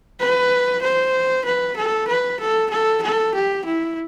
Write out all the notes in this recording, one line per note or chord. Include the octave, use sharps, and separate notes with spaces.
B4
C5
B4
A4
B4
A4
A4
A4
G4
E4